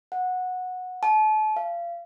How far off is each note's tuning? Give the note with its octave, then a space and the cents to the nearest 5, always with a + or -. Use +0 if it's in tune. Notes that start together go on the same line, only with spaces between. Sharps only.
F#5 -15
A5 -35
F5 -30